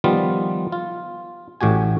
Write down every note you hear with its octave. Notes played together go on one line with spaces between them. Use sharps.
D#3 F3 G3 B3 F4
F4
A1 A2 F#4 G4 G#5